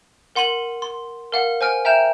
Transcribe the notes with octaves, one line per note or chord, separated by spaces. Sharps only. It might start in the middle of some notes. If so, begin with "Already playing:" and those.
A#4 F#5 C6 D#7 F#7
C6
A#4 F5 F#5
C5 G#5 F6 D7
E5 G5 A#5 F6 G6 E7